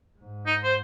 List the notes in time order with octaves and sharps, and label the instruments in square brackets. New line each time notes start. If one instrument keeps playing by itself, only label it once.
[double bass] G#2
[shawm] D#4
C5